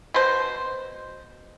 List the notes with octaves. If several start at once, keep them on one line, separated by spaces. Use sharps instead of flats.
B2 C5